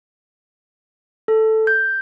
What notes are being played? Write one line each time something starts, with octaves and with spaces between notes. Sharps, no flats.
A4
G6